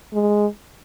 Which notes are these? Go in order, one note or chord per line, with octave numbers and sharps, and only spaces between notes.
G#3